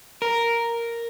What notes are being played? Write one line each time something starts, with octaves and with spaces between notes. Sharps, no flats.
A#4